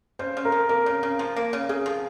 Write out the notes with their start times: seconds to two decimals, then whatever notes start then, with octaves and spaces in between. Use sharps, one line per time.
0.19 C#3 C5
0.37 C#3
0.45 A#4
0.52 F3
0.69 A#3 A#4
0.86 C#3
1.03 C#3
1.19 F3
1.36 A#3
1.53 C#3
1.69 C#3 G#4
1.86 F3